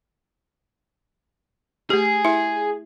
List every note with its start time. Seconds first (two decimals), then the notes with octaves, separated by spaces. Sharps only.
1.90 A3 G4 G#4
2.25 E4 E5